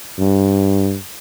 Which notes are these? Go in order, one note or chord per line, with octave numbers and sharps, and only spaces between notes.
G2